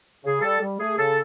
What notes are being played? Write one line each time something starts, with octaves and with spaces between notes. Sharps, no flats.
C#3 G#4
G3 A4
G3
A3 G#4
C#3 A4